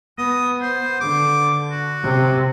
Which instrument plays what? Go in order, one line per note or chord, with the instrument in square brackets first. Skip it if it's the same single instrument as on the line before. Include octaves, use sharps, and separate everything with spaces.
[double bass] B3 [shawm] D#6
[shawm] C5
[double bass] D3 [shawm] D6
[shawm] F#4
[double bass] C3